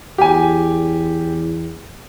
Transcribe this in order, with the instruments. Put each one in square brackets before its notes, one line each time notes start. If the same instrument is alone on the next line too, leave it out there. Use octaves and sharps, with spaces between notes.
[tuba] E2 [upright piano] G4 G#5